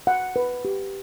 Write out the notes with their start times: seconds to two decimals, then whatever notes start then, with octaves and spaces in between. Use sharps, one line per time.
0.07 F#5
0.36 B4
0.65 G4